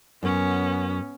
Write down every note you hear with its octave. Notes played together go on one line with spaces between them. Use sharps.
F#2 B3 C#4